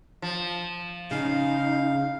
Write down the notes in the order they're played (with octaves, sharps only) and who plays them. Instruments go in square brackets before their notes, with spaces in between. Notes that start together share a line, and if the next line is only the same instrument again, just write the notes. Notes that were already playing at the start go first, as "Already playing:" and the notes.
[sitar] F3
[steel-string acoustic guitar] C#3 [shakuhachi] D#4 [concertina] F5